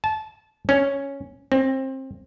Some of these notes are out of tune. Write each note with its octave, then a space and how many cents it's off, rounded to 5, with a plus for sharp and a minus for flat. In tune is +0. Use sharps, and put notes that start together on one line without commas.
A5 -20
C#4 +0
C4 +25